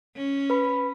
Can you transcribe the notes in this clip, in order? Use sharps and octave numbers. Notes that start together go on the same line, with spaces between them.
C#4
B4 B5